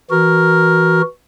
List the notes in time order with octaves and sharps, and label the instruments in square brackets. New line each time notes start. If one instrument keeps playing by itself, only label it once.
[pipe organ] E3 F#4 [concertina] A#4